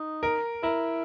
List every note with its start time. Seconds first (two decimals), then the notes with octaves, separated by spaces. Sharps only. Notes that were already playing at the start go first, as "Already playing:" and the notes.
Already playing: D#4
0.23 A#4
0.63 E4 A#4